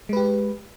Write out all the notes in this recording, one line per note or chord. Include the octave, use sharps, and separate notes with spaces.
G#3 G4 B4